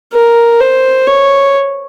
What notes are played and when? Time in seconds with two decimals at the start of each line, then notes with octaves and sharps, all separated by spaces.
0.13 A#4
0.60 C5
1.07 C#5